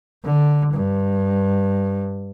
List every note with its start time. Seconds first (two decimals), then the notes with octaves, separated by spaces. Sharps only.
0.24 D3
0.74 G2